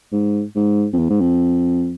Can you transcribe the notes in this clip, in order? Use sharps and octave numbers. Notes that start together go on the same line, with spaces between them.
G#2
G#2
F2
E2
G#2
F2